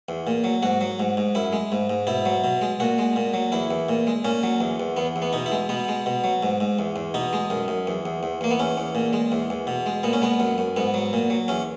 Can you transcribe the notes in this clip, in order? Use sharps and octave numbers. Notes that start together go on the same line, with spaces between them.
E2
A#2
F#3
G#2 F#4
F#3
G#2
G#2
F#2 E4
G#3
G#2
G#2
B2 E4
F#3
B2
G#3
A#2 F#4
G#3
A#2
F#3
E2 E4
E2
A#2
G#3
A#2 C#4
F#3
E2
E2
E2 B3
E2
B3
B2 D#4
E4
G#3
B2 B3
G#3
B2
F#3
G#2
G#2
E2
E2
B2 D#4
G#3
F#2
F#2
E2
E2
E2
E2 A#3
B3
E2 C#4
E2
A#2
G#3
E2
E2
B2
G#3
A#2 B3
C#4
G#3 B3
F#2
F#2
G#2 B3
F#3
A#2
F#3
E2 C#4